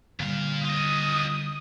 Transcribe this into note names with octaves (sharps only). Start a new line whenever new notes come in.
A#2 D3 G3 F5
F4 D#5 D#6